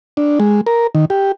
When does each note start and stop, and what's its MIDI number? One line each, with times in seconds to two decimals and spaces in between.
0.17 0.39 62
0.40 0.61 56
0.67 0.87 70
0.95 1.05 51
1.10 1.32 67